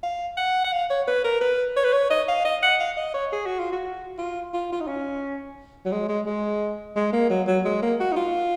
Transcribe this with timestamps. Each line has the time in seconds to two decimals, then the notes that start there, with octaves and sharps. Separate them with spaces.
0.03 F5
0.37 F#5
0.65 F#5
0.72 F5
0.90 C#5
1.07 B4
1.24 A#4
1.41 B4
1.76 C#5
1.85 B4
1.93 C#5
2.10 D#5
2.28 F5
2.45 D#5
2.63 F#5
2.79 F5
2.97 D#5
3.14 C#5
3.32 G#4
3.46 F#4
3.59 F4
3.72 F#4
4.18 F4
4.54 F4
4.72 F4
4.80 D#4
4.87 C#4
5.85 F#3
5.92 G#3
6.09 G#3
6.26 G#3
6.96 G#3
7.13 A#3
7.30 F#3
7.47 F#3
7.65 G#3
7.82 A#3
8.00 F#4
8.12 D#4
8.16 F4